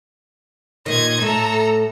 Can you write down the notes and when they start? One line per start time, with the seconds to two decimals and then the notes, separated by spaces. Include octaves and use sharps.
0.86 A#2 D#3 D#5 G#6
1.21 A2 A3 A4 A#5